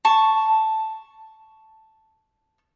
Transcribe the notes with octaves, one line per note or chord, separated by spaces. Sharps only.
A5 C#6